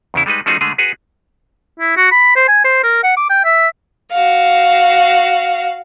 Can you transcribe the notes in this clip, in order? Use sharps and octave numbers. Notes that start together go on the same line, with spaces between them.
E2 C#3 E4
G3 G#3 D#4 B4
F3 A3 C#4 D#4 F#4 G#4
D3 G#3 A3 G#4
F#4 G#4 B4
E4
F#4
B5
C5
G#5
C5
A#4
F#5
D6
G5
E5
F#4 F5